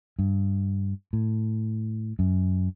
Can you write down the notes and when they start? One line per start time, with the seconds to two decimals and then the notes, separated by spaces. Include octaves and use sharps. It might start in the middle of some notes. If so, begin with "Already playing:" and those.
0.19 G2
1.13 A2
2.19 F#2